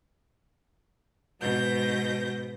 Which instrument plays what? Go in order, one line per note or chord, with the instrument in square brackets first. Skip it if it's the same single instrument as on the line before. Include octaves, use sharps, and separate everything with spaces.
[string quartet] G#2 B2 G6 A#6